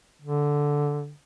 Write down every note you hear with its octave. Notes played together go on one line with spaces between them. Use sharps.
D3